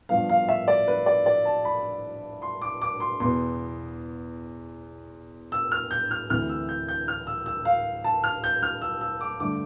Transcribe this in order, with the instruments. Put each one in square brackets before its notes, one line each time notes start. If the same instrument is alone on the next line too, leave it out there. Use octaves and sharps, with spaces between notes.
[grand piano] G2 F3 B3 F5
F5
E5
D5
B4
D5
D5
A5
B5
C6
D6
D6
C6
E2 B2 B3 C6
E6
F6
G6
F6
D2 C3 E3 F6
E6
G6
G6
F6
E6
E6
F5
A5
F6
G6
F6
E6
E6
D6
G2 D3 A3 D6